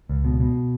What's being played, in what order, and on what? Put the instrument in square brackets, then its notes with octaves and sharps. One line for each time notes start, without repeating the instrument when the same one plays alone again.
[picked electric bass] C#2
B2
B2